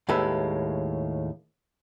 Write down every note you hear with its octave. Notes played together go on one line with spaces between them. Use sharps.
D#2 A2 G#3 A4 B4 E5